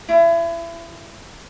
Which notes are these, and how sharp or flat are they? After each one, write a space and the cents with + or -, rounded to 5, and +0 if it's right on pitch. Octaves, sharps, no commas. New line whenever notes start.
E4 +30